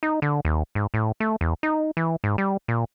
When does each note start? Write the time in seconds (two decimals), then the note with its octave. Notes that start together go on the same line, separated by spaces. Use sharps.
0.03 D#4
0.22 D3
0.45 D#2
0.75 G#2
0.94 A2
1.20 A3
1.41 E2
1.63 D#4
1.97 E3
2.24 G#2
2.38 G3
2.68 A#2